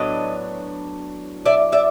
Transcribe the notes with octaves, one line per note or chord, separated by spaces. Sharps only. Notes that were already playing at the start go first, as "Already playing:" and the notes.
Already playing: A2 F#3 B3 D4 D#5
D5 E5
D5 E5